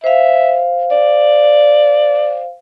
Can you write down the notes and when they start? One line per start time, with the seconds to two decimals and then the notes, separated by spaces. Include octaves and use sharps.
0.04 C5 E5 F5
0.91 D5